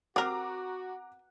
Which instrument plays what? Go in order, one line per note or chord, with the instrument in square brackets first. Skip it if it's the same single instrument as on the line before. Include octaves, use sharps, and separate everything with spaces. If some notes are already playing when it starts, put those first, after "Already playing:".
[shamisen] C4 A#4 [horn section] F#4 [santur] F#5 [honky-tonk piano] A#5 D6